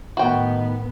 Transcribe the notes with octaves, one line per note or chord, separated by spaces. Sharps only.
A2 D#3 B3 F#4 G5